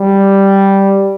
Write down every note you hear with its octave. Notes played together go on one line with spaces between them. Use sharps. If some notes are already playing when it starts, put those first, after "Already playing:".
Already playing: G3